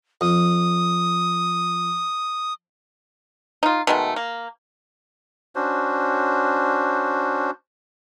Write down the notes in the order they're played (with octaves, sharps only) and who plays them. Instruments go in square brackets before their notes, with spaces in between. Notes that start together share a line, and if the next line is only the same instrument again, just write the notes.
[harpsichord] F2 [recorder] D#6
[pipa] D#4 F4
B2 D#3 G#3 A3
A#3
[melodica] C#4 D4 F#4 C5